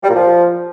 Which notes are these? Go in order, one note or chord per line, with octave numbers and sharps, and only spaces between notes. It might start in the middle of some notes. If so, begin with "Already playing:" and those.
G3
A#2
F3